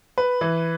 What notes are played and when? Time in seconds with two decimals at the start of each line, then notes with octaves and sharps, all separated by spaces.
0.18 B4
0.41 E3